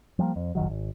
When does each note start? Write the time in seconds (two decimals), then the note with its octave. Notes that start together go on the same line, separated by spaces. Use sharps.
0.19 F3 G3 G#3 A#3
0.36 F2
0.55 F1 A#1 D#3 F#3
0.70 G#1